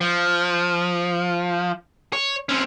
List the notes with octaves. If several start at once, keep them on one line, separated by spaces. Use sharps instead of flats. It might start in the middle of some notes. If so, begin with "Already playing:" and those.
F3
C#5
C4 C#4